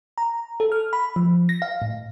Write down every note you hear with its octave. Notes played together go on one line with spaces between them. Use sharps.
A#5
A4
F6
B5
F3
A#6
F5
A2